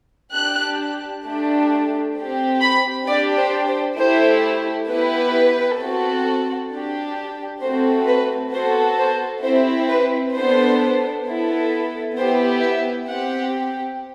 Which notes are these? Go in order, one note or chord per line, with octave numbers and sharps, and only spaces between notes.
D4 G4 F#6
A3 D4 G4
C4 G4
B5
D4 G4 D5
C5
C5
A3 E4 G4 C5
B3 E4 G4 B4
C4 F#4 A4
D4 G4
A3 C4 F#4 A4 C5
B4
B3 F#4 A4 C5
C5
C4 E4 G4 C5
B4
B3 D4 A4 C5
B3 E4 A4
B3 E4 G4 C5
E5
C4 G4 F#5